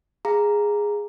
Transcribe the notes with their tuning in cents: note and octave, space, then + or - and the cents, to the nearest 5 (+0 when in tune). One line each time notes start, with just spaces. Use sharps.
G#4 -5 F5 +0 A#5 +0